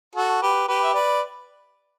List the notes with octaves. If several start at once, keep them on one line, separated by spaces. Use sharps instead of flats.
F#4 A4
G4 B4
G4 B4
E5
B4 D5